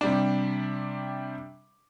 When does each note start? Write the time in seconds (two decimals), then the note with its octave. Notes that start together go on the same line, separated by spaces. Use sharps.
0.01 C3 G3 D4